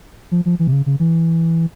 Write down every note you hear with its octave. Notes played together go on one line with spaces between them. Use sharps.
F3
F3
E3
C3
C#3
C#3
E3